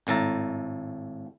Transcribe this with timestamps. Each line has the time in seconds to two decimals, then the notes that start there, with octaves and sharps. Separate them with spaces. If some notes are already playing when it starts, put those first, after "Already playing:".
0.07 G#1 A2 A4 A#5